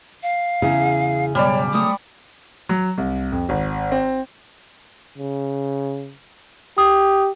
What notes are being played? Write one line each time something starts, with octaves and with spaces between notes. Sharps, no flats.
F5
E2 C#3 E4 G#4
G2 B2 F#3 G3 C#5 D5
F#3 A3 C#5 D#6
F#3
C2
F2
G#1
C4
C#3
G4 D#6